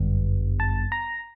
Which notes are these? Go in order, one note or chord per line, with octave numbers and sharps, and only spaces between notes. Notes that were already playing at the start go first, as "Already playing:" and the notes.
Already playing: G1 F#2 D3 G3 B3
A5
A#5